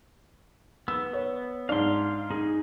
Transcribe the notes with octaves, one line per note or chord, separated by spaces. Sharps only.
B3 E6
C#5
G#2 D4 F5 C6
D#4 G#4